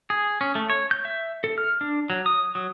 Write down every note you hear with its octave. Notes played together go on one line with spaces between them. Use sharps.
G#4
C#4
A3
C#5
G6
E5
A4
F6
D4
F#3
D#6
F#3